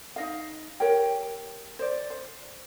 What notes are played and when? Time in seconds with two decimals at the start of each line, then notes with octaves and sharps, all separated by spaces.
0.16 D#4 D#5 F5
0.80 G4 A#4 C#5 G5
1.79 C5 D5
2.10 C5